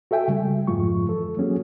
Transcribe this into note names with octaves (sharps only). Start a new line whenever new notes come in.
F#4 A4 E5 G5 G#5
C#3 G3 G#3
F2 G#2 F3 G#3 F4 C#6
E3 A4
F#3 A#3 C#4 F#4 G#4